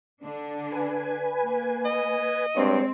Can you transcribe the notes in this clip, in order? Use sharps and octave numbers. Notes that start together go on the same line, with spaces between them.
D3 D4
B4 G#5
A#3
D#5
G2 G#3 C4 C#5